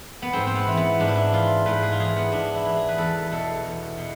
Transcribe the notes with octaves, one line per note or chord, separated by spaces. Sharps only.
B3
G#2 C4
C4
B3
E3
B3
G#2 D4
E4
D4
E3 F4
G#2 B4
G#4
F4
E3 G#4
B3
G#2 D4
E4
E3
G#4
B4
E2 A4
B2 A4
E2
B2